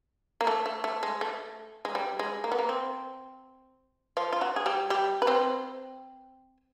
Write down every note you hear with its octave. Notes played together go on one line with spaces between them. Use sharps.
A#3
A3
A3
A3
G#3
A3
G#3
G3
G#3
A#3
B3
A#3
C4
F3 F4
F4
F#3 F#4
G#4
G3 G4
G3 G4
B4
C4 C5